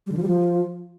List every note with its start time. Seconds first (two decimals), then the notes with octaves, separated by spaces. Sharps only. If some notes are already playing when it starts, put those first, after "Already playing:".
0.06 G3
0.12 D3
0.17 F3
0.22 G3
0.28 F3